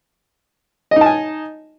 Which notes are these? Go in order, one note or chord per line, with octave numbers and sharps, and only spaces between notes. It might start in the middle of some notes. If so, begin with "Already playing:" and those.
D#4 D#5 G#5 A5